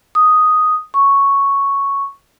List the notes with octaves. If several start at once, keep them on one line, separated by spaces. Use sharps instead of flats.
D#6
C#6